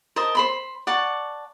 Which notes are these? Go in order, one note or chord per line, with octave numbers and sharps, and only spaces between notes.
A#4 C5 D#5 A5
C5 B5 C6
D5 F#5 A5 C#6